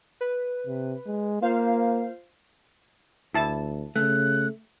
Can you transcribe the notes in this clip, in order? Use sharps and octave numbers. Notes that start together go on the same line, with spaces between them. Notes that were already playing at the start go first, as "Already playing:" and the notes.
B4
C3
G#3
A#3 F4 C5 F5
D2 E4 A5
C#3 A3 F#6